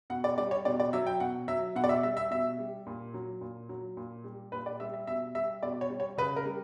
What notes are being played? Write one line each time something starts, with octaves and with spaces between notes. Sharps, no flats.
B2 F#5
D5
G3 D5
C#5
B2 D5
D5
F#3 E5
G5
B2 F#5
F#3 E5
B2 F#5
D5
E5
G3 E5
E5
B2 E5
G3
A#2
F#3
A#2
F#3
A#2
G3
A#2 B4
D5
G3 E5
E5
B2 E5
G3 E5
B2 D5
C#5
G3
C#5
C#3 B4
A#4
G3